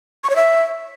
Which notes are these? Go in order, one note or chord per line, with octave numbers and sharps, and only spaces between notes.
C#6
C#5
E5